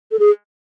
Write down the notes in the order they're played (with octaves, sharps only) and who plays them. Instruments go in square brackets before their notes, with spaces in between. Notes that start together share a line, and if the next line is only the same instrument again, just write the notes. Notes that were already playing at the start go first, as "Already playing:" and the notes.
[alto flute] A4
G#4